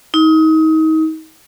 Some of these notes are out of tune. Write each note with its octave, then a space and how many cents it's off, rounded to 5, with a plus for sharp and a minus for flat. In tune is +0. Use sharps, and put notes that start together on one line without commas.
D#4 +30